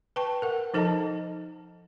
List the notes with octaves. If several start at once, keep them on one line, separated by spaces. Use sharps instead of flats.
B4 G5 A5 C#6
A#4 F#5
F3 D#4 A4 D#5 A5 A#5